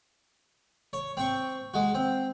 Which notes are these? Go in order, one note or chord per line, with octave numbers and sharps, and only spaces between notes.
C#5
C4 G5 C#6
G#3 F#4
C4